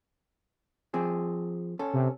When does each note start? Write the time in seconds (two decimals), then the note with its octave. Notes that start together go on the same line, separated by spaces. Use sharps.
0.94 F3 C4 G#4
1.79 C#4 A4
1.94 C3